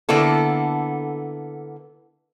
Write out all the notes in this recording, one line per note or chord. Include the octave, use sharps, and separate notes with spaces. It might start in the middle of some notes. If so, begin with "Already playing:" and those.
D3 A#3 B3 E4 A4